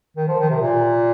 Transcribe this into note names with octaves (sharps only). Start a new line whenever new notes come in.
D#3
F3
D#3
C3
A#2